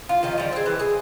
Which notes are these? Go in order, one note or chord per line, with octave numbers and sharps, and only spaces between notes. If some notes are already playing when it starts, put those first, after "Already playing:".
F4
D#3 F3 D#5
F3 G3
C4 G#4
E3
G#4